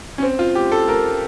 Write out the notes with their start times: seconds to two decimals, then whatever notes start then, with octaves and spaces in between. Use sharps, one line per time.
0.18 C#4
0.23 C4
0.39 F4
0.55 G4
0.72 A4
0.88 A#4